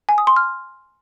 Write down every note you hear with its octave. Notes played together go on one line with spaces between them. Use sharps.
G#5
D#6
C6
F6